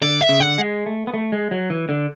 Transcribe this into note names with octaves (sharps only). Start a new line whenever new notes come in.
D3 D5
E5
C#3
D3 F#5
G#3
A3
B3
A3
G#3
F#3
E3
D3